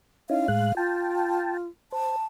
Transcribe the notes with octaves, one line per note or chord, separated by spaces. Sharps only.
C#4 D#4 E4 F5
A2 G#3 F#6
F4 G5 A5
C5 A5